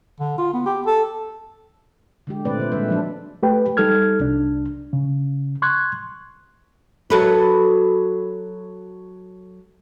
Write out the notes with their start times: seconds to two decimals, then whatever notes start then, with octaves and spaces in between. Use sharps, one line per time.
0.20 D3
0.38 F4
0.54 B3
0.66 G4
0.86 A4
2.27 D3 G#3 G4
2.45 A#2 D3 A3 C4 B4 D5
2.59 D3 C5
2.72 A#2 D#3 G3 G#3 B4 E5
2.88 F3 F#3 D4
3.43 A3 G4 B4 G5
3.77 G3 D#4 A4 F6 G#6
4.20 C2 D4
4.93 C#3
5.62 C6 C#6 F#6 G#6
7.10 F#3 A4 B4